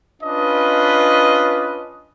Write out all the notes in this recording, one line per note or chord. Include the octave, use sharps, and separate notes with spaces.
C#4 D4 F4 B4 D#5